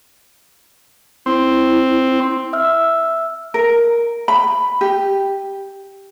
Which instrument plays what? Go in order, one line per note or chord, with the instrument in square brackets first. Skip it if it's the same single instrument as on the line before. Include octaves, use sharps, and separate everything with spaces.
[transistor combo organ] C4 [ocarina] E4
[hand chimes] E5 E6 F6
[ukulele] A#4
B5
G4